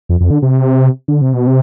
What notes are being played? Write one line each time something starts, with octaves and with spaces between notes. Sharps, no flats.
F2
F2
D3
C3
D3
C3
B2
C3